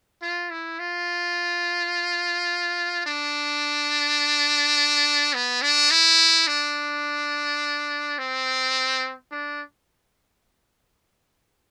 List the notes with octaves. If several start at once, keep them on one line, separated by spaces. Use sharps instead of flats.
F4
E4
F4
D4
B3
D4
E4
D4
C4
D4